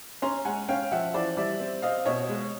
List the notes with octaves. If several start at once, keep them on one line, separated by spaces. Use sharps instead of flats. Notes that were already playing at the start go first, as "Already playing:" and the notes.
C#4 A#5 C6
G#3 F#5 G#5
C#4 F5 G5
F3 E5 F#5
E3 C5 D5
G3 D5 E5
C4
C4 D#5 F5
B2 C#5 D#5
G#3